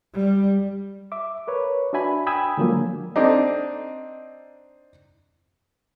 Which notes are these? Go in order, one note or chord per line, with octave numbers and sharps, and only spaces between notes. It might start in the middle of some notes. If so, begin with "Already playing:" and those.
G3
E5 D6
A#4 B4 C#5
D4 F#4 E5 G#5 B5
G5 G#5 B5 D#6 E6 G#6
D3 F3 F#3 G#3 A#3
C4 D4 D#4